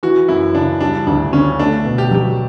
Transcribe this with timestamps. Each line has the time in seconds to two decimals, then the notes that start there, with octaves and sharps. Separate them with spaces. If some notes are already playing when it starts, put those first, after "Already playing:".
0.03 E3 F#4
0.29 F#2 E4
0.55 C#3 D4
0.80 G3 D4
1.07 D2 D4
1.33 D3 C#4
1.59 A3 D4
1.85 B2
1.98 G4
2.11 F#3 G4